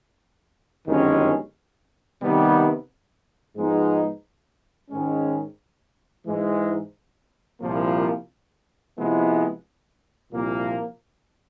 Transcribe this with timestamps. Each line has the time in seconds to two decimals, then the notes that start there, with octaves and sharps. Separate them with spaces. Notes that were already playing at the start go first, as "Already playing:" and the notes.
0.85 G1 F#2 D#3 G#3 C#4
2.20 C3 D#3 G3 B3
3.55 G#2 F3 G#3 B3 D#4
4.91 G#2 D#3 G#3 C#4
6.26 G#2 E3 G#3
7.61 C2 A#2 F3 A#3
8.97 C3 F3 G#3 B3 E4
10.32 C2 A#2 F3 A#3